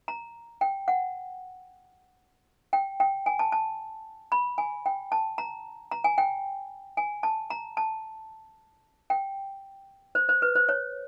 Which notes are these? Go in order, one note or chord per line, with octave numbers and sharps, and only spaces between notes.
A#5
G5
F#5
G5
G5
G#5
A5
A5
B5
G#5
G5
A5
A#5
A#5
G#5
G5
G#5
A5
A#5
A5
G5
C5
C5
B4
C5
C#5